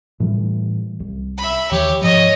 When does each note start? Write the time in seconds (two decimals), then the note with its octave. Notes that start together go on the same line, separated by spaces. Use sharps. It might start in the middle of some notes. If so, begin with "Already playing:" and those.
0.20 A2 E3 G3
1.00 C2
1.38 E5 B5
1.71 D#2 E3 G4 C#5
2.02 G#2 F3 C#5 D#5